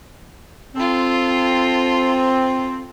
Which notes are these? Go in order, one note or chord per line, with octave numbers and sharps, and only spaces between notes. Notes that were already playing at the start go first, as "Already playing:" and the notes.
C4 F4 A4